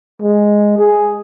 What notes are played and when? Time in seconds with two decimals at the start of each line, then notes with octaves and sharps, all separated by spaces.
0.22 G#3
0.79 G#4